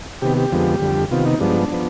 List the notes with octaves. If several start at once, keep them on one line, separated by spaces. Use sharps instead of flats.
C3 D#3 B3 G4
G4
F2 D3 F3 G#3 B3
F2 D3 G3
C3 D#3 B3 F4
D#4
G2 F3 G#3 B3 D4
F3 B3